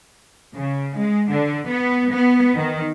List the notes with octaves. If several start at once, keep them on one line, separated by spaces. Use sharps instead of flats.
C#3
G#3
D3
B3
B3
D#3